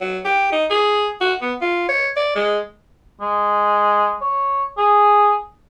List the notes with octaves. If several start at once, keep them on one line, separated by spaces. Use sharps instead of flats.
F#3
G4
D#4
G#4
F#4
B3
F4
C#5
D5
G#3
G#3
C#5
G#4